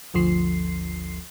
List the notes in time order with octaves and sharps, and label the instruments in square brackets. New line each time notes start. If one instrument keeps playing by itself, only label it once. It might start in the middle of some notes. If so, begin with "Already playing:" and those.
[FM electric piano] G1 D2 F3 C7